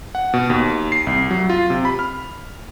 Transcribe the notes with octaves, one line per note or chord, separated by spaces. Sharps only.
F#5
B2
D#2
C7
C2
F#3
F4
C3
B5
F6